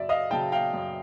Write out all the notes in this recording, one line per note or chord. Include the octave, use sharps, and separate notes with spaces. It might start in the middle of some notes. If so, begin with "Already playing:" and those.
Already playing: F#2 C#3 F#3 D5 E5
D#5 F5
C#3 F#3 G5 A5
F5 G5
F#2